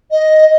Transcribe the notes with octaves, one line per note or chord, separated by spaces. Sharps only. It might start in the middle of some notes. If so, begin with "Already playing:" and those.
D#5